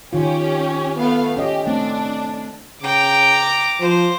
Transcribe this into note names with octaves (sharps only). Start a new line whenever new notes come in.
D#3 C#4 F4 G4
A3 B3 F5
C#4 G4 D#5
A3 C4 D4
C#3 G5 A#5 D6
F3 C5